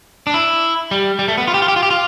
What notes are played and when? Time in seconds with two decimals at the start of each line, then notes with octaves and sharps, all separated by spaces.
0.27 D4
0.34 E4
0.91 G3
1.19 G3
1.28 A3
1.38 B3
1.47 F4
1.54 G4
1.62 F4
1.68 G4
1.76 F4
1.83 G4
1.91 F4